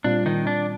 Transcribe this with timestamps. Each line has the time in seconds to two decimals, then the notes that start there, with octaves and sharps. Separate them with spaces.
0.04 A#2 G3 C4 D4 F4
0.26 D#3 D#4
0.47 D4